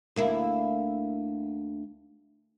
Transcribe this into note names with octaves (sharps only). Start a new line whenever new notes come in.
D2 A#3 E4